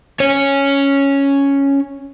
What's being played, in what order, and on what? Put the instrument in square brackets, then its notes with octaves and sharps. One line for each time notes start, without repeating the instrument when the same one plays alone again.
[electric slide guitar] C#4 C#5